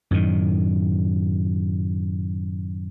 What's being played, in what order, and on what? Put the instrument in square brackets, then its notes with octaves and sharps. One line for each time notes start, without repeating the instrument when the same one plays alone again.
[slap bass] F#2 A2 D#3